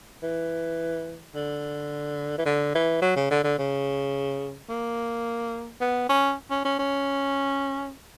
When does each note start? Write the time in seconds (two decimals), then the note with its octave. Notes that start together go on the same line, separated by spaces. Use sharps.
0.23 E3
1.35 D3
2.38 E3
2.46 D3
2.75 E3
3.02 F#3
3.16 C#3
3.31 D3
3.44 D3
3.59 C#3
4.70 A#3
5.81 B3
6.09 C#4
6.51 C#4
6.65 C#4
6.79 C#4